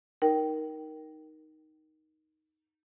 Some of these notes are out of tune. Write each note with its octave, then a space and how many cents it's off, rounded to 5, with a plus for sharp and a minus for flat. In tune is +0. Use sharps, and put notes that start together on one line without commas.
D#4 +0 A#4 +10 G5 -15